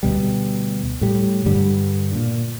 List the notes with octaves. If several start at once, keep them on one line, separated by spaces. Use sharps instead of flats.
D2 B2 G3
A2 G3
G2 D3 G3
A#2